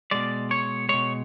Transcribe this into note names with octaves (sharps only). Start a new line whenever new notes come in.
B2 G#3 D5
C#5
B2 G#3 C#5